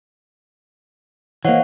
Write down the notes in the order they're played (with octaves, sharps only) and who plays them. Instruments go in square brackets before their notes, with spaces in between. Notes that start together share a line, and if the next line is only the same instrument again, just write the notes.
[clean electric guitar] E3 A#3 [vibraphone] C5 D#5 F5 [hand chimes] C#5 F#5